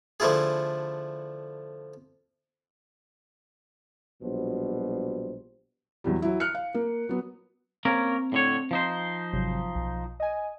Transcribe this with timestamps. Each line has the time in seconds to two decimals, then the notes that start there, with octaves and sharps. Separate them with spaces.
0.20 D3 F3 A3 E4 F4 G#4
4.23 A#1 B2 F#3 G3 C5
6.04 E2 F#3 G3
6.22 F#3 E4
6.40 F6 F#6 C#7
6.55 F5
6.74 A#3
7.09 F#3 B3
7.85 A#3 C4 C#4 A#4
8.32 A2 D3 C#5
8.71 F3 D#4 C5
9.33 G#1 C3 F#3
9.75 B1
10.20 D#5 G#5